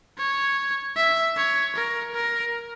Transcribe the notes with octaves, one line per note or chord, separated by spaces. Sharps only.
C#5
E5
C#5
A#4
A#4